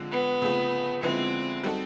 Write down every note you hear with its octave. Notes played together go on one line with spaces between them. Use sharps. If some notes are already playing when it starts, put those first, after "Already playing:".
Already playing: D3 F3 G#3 C4
B3
C#3 F3 A3 C4
D3 F3 G#3 B3 C4 E4
G3 C4 D#4 F#4 A4